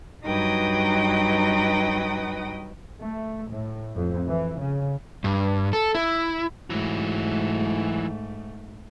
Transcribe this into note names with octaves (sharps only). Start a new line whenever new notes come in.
G2 F#3 D#4 B4 G5 D#6
A3
A2
F2
E3
C#3
G2
A4
E4
G#2 E3 F#3 A3